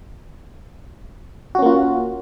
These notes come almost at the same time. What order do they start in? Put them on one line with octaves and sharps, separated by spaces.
F#4 C#4 A#3 F4